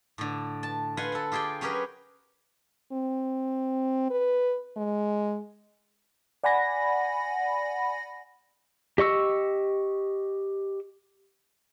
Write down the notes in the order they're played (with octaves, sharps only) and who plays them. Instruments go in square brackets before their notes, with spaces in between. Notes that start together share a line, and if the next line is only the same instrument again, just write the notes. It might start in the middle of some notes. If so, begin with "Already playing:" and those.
[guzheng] A2 D3
A5
F4 B4 F#5 G#5 C6
A4 F#5
F4 G4 G#4 D5 G5
F#3 C#4 G4 G#4 A#4 B4
[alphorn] C4
B4
G#3
[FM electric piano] D5 F#5 G#5 B5 A#6
[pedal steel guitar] G4 D#5 C#6 E6